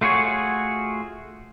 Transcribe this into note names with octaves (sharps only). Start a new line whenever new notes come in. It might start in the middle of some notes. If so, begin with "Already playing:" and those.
A3 F4 F#4 G#4 C#5